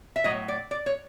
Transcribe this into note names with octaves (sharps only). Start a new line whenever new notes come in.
E5
A2 F#3 D#5
D5
D5
C#5